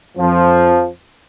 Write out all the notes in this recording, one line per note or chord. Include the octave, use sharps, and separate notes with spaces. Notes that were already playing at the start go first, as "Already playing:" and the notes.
F2 F3